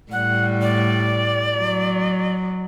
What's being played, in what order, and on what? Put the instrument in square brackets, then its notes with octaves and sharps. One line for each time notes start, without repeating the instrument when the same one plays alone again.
[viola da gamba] A2 G3 [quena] F#5
[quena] D5
[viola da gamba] F#3